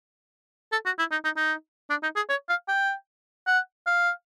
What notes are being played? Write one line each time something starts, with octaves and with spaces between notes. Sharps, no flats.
A4
F#4
E4
D#4
D#4
D#4
D4
D#4
G#4
C#5
F5
G5
F#5
F5